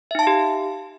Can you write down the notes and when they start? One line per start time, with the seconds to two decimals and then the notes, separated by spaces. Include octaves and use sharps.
0.11 E5
0.15 D#4
0.19 A5
0.23 F5
0.27 G4